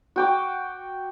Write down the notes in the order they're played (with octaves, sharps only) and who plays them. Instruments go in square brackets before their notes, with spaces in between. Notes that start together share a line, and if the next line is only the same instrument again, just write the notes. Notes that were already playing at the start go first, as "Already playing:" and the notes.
[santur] F#4 G5 D6